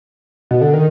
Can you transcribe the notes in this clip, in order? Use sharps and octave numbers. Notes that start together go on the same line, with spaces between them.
B2
D3
D#3